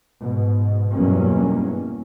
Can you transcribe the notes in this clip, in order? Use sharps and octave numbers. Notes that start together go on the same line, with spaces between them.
G#2 B2
E2 G2 B2 F#3 A#3 C#4